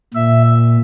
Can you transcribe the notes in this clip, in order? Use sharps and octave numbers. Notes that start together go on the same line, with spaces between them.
A#2 E5